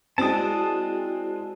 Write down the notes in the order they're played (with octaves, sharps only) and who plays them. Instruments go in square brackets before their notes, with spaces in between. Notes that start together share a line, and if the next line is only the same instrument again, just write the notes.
[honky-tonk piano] G#3 C4 [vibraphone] E4 F#4 D5 [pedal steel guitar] A5 D#6